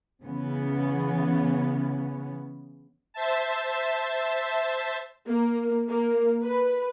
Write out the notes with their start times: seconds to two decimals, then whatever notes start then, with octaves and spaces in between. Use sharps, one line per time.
0.23 C#3 E3 B3 C#4
3.14 C5 E5 A5
5.27 A#3
5.89 A#3
6.42 B4